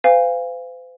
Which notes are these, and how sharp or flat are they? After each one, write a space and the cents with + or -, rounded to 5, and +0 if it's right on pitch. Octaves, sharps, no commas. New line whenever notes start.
C5 -45 F5 -10 G#5 -30